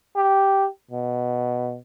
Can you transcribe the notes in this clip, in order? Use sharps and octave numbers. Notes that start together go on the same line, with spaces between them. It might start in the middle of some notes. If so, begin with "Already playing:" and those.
G4
B2